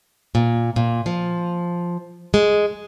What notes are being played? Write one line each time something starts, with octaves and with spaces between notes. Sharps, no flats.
A#2
A#2
F3
G#3